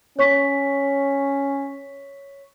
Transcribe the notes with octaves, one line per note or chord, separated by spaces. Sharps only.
C#4 C#5 C#6 B6